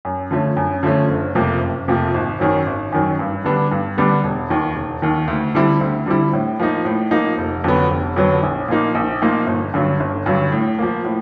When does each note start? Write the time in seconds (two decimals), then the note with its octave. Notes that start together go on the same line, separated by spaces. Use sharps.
0.05 F#2
0.31 D3 F3 A3 C#4
0.57 F#2
0.83 D3 F3 A3 C#4
1.08 F#1
1.35 F2 C3 F3 A#3
1.61 F#1
1.88 F2 C3 F3 A#3
2.14 G#1
2.40 F#2 D#3 F#3
2.66 G#1
2.92 F#2 D#3 F#3
3.19 G2
3.45 D3 G3 B3 D4
3.71 G2
3.97 D3 G3 B3 D4
4.24 E1
4.50 D#2 D#3
4.75 E1
5.02 D#2 D#3
5.28 D2
5.55 D3 G3 C4 E4
5.81 D2
6.06 D3 G3 C4 E4
6.33 A2
6.60 F3 A#3 D#4
6.85 A2
7.11 F3 A#3 D#4
7.38 F1
7.64 F2 D3 F#3 B3
7.91 F1
8.16 F2 D3 F#3 B3
8.43 A#1
8.68 A#2 F3 A#3 D#4
8.95 A#1
9.22 A#2 F3 A#3 D#4
9.47 G1
9.74 G2 D3 F#3
10.00 G1
10.26 G2 D3 F#3
10.52 A2
10.79 F3 A#3
11.05 A2